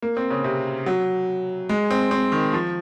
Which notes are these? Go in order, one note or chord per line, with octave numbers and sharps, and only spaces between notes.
A#3
C4
C#3
C3
F#3
G#3
C4
C4
D#3
F3